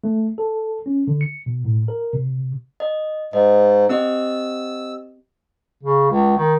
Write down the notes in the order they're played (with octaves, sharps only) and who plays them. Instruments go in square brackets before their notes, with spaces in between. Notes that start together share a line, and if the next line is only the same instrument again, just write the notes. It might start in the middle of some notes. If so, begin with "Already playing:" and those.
[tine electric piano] A3
A4
C#4
D3
C#7
B2
A2
A#4
C3
[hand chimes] D#5
[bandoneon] G#2 [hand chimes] D#5
[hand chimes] C4 G4 D#5 [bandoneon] E6
[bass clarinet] C#3
C#2
D#3